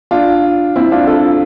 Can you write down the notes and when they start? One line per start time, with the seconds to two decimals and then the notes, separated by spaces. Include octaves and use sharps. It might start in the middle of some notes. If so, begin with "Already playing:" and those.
0.11 D4 F4
0.76 C4 E4
0.91 D4 F4
1.07 F4 A4